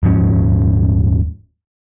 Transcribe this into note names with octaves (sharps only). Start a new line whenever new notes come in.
D#1 G#2 F3 C#4